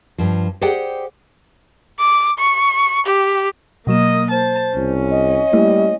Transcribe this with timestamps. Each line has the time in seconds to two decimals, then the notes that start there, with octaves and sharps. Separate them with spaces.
0.18 G2 F3
0.61 G4 G#4 C5 D5 F#5 G5
1.99 D6
2.38 C#6
3.06 G4
3.87 B2 F#3 A#3 D#5 E7
4.31 C5 A5
4.76 C2 C#4
5.11 D#5
5.53 G3 A3 A#3 E4